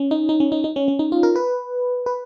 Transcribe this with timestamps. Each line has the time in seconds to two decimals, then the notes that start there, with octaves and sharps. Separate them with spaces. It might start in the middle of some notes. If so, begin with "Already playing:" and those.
Already playing: C#4
0.11 D#4
0.29 D#4
0.40 C#4
0.52 D#4
0.64 D#4
0.76 C#4
0.88 C#4
0.99 D#4
1.12 F4
1.23 A#4
1.36 B4
2.06 B4